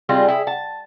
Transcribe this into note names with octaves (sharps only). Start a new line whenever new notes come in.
G3 G#3 C4 F4
E4 G#4
A5